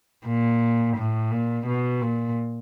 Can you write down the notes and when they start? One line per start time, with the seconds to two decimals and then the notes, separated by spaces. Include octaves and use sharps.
0.26 A#2
0.97 A2
1.31 A#2
1.67 B2
2.01 A#2